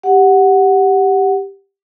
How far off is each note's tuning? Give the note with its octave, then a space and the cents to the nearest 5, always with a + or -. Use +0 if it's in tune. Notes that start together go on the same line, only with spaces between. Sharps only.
G4 +0 F#5 +0